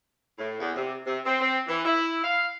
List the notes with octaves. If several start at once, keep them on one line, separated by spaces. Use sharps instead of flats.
A2
E2
C3
C3
C4
C4
E3
E4
F5